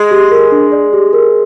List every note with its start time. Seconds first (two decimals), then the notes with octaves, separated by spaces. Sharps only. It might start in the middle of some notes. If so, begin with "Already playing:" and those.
Already playing: G#3
0.11 G4
0.31 A#4
0.52 D4
0.72 D5
0.93 G4
1.13 A#4